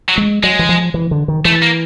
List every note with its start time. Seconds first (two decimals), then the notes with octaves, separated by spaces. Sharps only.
0.09 F#3
0.17 G#3
0.43 F#3 G#3
0.59 E3
0.69 F3
0.94 E3
1.11 D3
1.28 D#3
1.45 E3 A3
1.62 A#3